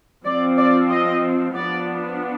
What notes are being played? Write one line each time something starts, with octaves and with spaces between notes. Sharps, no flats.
F3 C4 D5
D5
D#5
F3 B3 D4 D5